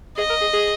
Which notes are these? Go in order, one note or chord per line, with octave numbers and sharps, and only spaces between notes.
G#4 D#5
A#4
G#4
G#4